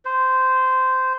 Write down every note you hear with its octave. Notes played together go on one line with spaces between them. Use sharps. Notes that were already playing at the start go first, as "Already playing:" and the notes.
C5